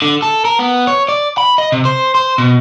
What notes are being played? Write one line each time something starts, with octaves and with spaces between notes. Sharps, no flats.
D3
A4
A#4
B3
C#5
D5
B5
D#5
C3
C5
C5
B2